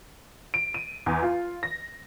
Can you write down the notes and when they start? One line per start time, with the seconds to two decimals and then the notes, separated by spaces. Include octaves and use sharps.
0.54 D7
0.74 D#7
1.06 E2
1.23 F4
1.63 A#6